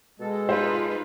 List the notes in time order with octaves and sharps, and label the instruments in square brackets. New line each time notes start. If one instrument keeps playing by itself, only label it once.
[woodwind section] B2 A4 [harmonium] G#3
[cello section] D#4 F4 B4 [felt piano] C5